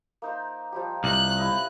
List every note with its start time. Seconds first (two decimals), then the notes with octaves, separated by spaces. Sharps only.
0.22 A#3 D#4 C5
0.72 F3 G3 G4
1.04 C2 F#6
1.37 E4 D#5